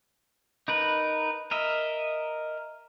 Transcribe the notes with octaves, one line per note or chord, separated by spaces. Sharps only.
D#4 A#4 B4
A#4 D#5 E5